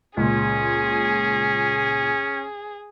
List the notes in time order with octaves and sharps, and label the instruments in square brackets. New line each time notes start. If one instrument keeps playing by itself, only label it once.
[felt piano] C#2 A#2 [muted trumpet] C#4 [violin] G#4